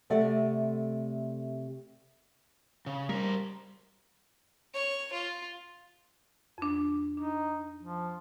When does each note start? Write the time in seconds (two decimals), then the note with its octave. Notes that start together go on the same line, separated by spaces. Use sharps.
0.10 C3 A3 A4 D5 F#5
2.86 C#3
3.09 G3 A#4 C5
4.74 C#5
5.13 F4
6.58 F2 D4
7.17 D4 D#4
7.83 F3